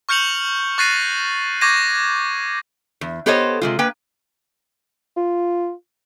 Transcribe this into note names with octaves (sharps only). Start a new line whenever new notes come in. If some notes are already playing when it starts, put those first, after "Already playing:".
C#6 F6 G6 C#7 F7 F#7
C#6 F#6 A6 A#6 C7 D#7
C#6 D6 G6 G#6 A#6 D#7
E2
B3 G4 A4 C5 C#5 D#5
C3 G#3 F4
A#3 B4 G5
F4